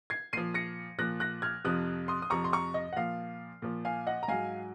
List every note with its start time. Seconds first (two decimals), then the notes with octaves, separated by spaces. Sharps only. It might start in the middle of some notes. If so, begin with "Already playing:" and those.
0.10 G#6 C7
0.33 A#2 F3 C7 D#7
0.54 A#6 C#7
0.99 A#2 F3 F#6 A#6
1.20 F#6 A#6
1.42 F6 G#6
1.64 F2 C3 F3 D#6 F#6
2.08 C6 D#6
2.22 D#6
2.30 F2 C3 F3 A#5 C#6
2.44 C6
2.53 A#5 C#6
2.74 D#5
2.93 F#5
2.96 A#2 F3 F5
3.62 A#2 F3
3.85 F5 G#5
4.07 D#5 F#5
4.23 A#5
4.28 G#2 F#3 F5 G#5